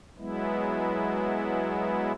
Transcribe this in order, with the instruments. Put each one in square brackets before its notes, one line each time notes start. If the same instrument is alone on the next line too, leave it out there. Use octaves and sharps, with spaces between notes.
[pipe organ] F#3 G#3 B3 E4